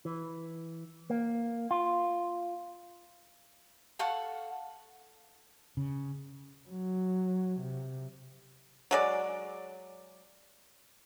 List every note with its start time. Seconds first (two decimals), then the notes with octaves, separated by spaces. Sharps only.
0.05 E3
1.10 A#3
1.71 F4
3.99 A4 F5 F#5 C#6
5.77 C#3
6.69 F#3
7.61 C3
8.91 F#3 G#3 D5